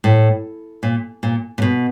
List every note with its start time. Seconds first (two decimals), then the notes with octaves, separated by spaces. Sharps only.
0.04 A2
0.83 A#2
1.23 A#2
1.58 A#2
1.62 B2